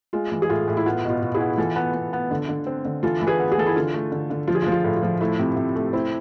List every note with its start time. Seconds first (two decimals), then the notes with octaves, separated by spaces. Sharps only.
0.13 G#3 F4
0.32 E3
0.42 G#4
0.50 A2 F4
0.68 A2
0.77 E4
0.86 B3 F4
1.04 B2
1.10 F4
1.22 B2
1.34 E4 G#4
1.41 B3
1.58 E3 F4 A4
1.76 B3
1.94 B3
2.13 B3
2.31 D3
2.49 D3
2.67 C4
2.85 D3
3.03 E3 F4 A4
3.22 E3
3.27 G#4 B4
3.39 B3
3.52 G#4
3.58 E3 A4
3.67 E4 G#4
3.76 D3 F4
3.94 A3
4.12 D3
4.30 D3
4.48 F3 F4
4.55 G#4
4.62 F4
4.67 F3
4.72 F4
4.84 A2
4.96 F4
5.03 F3
5.21 A3 E4
5.39 C3
5.56 C3
5.76 A3
5.93 C4 E4